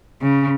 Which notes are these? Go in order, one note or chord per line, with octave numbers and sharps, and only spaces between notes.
C#3